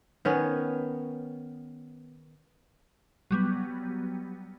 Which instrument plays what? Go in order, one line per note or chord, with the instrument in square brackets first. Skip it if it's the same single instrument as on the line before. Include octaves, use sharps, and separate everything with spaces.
[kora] D#3 B3 C#4
[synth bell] F#3 G3 B3